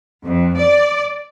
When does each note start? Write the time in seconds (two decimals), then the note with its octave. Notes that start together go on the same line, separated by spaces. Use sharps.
0.24 F2
0.58 D5